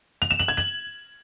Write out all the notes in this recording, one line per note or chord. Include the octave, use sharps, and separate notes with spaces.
F7
E7
F#7
G#6
F#7